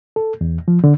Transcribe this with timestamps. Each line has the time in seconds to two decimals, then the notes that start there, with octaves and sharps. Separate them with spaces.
0.16 A4
0.41 E2
0.68 F3
0.84 D3